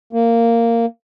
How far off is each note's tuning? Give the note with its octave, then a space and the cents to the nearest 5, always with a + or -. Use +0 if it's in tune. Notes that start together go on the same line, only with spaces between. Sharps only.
A#3 -10